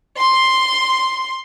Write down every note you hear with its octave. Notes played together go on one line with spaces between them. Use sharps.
C6